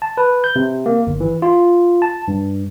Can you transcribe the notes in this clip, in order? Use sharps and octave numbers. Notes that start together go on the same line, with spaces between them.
A5
B4
G6
C3
A#3
G1
E3
F4
A5
G2